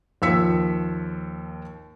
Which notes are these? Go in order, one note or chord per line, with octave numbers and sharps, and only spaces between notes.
D#2 F3 E6 B6 C#7